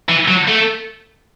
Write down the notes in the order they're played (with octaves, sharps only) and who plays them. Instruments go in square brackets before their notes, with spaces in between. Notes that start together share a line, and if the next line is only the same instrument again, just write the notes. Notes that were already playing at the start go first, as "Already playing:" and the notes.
[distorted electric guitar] E3
F#3
A3